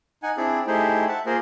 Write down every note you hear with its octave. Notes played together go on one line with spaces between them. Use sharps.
D#4 F#5 G#5
C4 D4 E4 G#4 D5
A3 D#4 E4 G4 G#4 C5
E5 F#5 A5
A#3 F4 G#4 A#4 C5